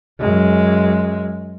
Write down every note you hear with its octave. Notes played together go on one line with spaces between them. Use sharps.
F#2 G#3